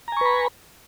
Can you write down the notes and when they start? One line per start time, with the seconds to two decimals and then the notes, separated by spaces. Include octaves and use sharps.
0.08 A#5
0.12 G#5
0.17 C#6
0.21 B4
0.26 B5